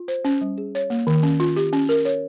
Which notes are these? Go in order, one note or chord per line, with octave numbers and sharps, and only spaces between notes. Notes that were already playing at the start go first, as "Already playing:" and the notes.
Already playing: F4
C5
C#4
G3
G#4
C#5
A#3
D#3
C#4
F4
G4
C#4
A#4
C#5